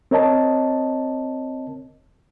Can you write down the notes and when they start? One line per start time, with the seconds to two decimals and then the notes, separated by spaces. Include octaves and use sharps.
0.11 C4 A#4 C#5 D#5 A5